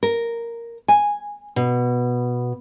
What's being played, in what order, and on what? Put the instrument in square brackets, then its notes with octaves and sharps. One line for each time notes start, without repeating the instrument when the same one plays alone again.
[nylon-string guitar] A#4
G#5
B2